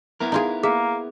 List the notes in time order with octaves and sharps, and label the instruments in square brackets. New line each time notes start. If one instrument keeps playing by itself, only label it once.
[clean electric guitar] B3 E4 A#4
[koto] D#4 F4 G#4
[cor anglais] A#3 [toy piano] G#4 [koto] E5